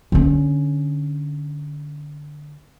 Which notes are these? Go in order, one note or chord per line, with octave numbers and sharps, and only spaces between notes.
D3 C#4